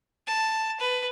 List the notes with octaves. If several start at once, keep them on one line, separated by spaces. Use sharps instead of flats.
A5
B4